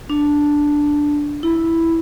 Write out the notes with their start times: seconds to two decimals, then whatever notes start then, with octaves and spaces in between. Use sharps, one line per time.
0.10 D4
1.43 E4